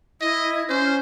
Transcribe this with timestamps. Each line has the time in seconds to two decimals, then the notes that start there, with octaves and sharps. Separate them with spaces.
0.21 E4 D#5
0.69 C#4 C5